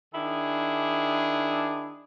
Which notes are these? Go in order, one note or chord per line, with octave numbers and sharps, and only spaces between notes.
D#3 D4 E4 G#4